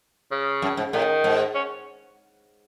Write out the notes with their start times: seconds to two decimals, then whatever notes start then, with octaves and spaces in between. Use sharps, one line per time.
0.32 C#3
0.62 F#2
0.77 G#2
0.93 A2 D#3
1.24 G#2
1.55 C#4